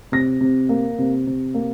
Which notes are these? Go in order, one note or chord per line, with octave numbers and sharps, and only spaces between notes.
C3 A#6
C3
A#3
C3
C3
A#3